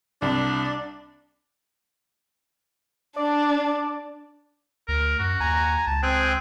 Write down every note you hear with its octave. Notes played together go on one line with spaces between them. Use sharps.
C2 D4
D4 D5
D2 A#4
F#2 F#4
D#2 G#5 A#5
C#2 A5
C4 G#4 G5 F#6